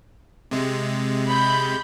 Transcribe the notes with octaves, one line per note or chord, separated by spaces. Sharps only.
C3 G#3
B5 G6